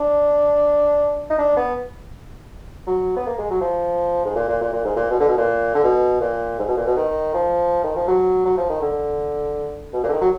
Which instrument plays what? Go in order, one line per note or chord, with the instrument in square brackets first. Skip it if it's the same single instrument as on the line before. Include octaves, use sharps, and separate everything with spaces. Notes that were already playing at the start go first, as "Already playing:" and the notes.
Already playing: [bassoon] D4
D#4
D4
B3
F#3
B3
A#3
G#3
F#3
F3
G#2
A#2
A#2
A#2
A#2
G#2
A#2
B2
D3
B2
A#2
D3
B2
A#2
G#2
B2
A#2
B2
D#3
F3
D#3
F3
F#3
F#3
F3
D#3
D3
B2
A#2
D3
D#3
F#3